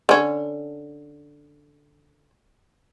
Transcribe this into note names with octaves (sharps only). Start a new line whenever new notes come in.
D3 C#4